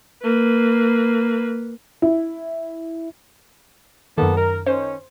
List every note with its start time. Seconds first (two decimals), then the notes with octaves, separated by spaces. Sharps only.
0.23 A#3 B4
2.02 E4
4.18 F#2 D#3 A#3 B3 A4
4.37 A#4
4.66 D#3 C#4 C5